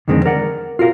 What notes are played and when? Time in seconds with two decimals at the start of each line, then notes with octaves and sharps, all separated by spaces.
0.08 F2 D3 D#3 G#3 C4
0.26 A#4 D5 F#5
0.79 F4 F#4 A#4 F5